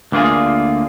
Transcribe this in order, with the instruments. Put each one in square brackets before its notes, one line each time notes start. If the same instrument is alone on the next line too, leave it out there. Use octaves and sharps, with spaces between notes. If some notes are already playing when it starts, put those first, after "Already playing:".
[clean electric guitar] D2 D3 A#3 F4 G#4